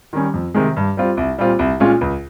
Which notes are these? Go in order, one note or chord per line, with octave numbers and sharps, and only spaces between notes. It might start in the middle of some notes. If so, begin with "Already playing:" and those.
D#3 G3 C#4
F2
C3 D#3 G#3
G2
G3 C4 F4
C2
A#2 G3 C4 F4
C2
A#2 G#3 C#4 F4
C#2